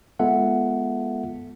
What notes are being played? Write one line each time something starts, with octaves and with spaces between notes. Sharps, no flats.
G#3 B3 F4 A4 E5 F#5